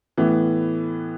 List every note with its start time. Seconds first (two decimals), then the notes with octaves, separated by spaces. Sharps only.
0.17 A2 E3 B3